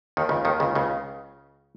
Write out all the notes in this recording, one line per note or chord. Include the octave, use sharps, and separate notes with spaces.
D#2 D#3
C#2 C#3
D#2 D#3
C#2 C#3
C#2 C#3